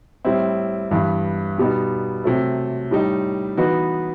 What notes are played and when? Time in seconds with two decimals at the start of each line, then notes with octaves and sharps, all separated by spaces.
0.25 A2 G3 C4 E4
0.91 G2 E3 B3
1.58 B2 G3 B3 D#4
2.24 C3 F#3 A3
2.91 A2 G3 D#4
3.57 E3 B3 D#4 F#4 B4